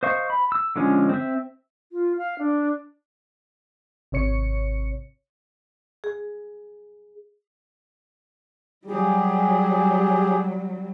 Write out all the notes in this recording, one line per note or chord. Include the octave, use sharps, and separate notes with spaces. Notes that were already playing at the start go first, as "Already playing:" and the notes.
C5 D#5 F5 C#6
B5
E6
D3 F3 G#3 C#4
C4 E5
F4
F5
D4
G#1 C3 C#5 C#7
G#4
F#3 G3 G4 G#4